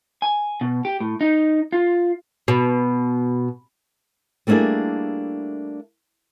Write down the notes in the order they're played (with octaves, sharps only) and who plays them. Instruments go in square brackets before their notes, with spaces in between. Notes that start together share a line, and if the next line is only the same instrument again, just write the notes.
[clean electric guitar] G#5
B2
G4
A2
D#4
F4
[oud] B2
[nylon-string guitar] G3 A3 A#3 D4 E4 G#4